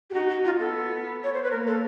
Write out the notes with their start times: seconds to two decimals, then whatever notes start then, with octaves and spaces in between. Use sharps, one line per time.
0.10 G4
0.13 D#4 F#4
0.29 F#4
0.45 F4
0.59 B3 A4
1.24 C#5
1.34 C5
1.43 B4
1.51 A#3 A#4
1.67 A4